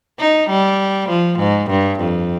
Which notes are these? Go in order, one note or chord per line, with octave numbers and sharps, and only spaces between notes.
D#4
G3
F3
G#2
G2
F2